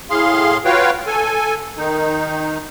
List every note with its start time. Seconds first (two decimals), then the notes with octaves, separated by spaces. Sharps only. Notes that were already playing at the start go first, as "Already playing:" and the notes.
0.10 A2 G#4 F5 C6
0.65 F4 F#4 B4 C#5 F5 G5
1.07 A4 G#5
1.78 D#3 D#4